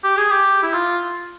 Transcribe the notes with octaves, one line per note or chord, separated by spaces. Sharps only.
G4
G#4
G4
E4
F4